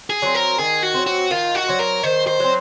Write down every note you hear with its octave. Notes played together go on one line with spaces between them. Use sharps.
G#4
F#3 C4
A#4
D#3 G#4
F#4
F#3 C4
F#4
D#3 F4
F#4
F#3 C4
A#4
D#3 C5
C5
F#3 C4